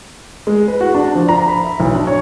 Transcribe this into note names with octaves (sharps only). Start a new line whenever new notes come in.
G#3
B4
F#4
D4
F3
A#5
B5
E5
B1
D4
C#5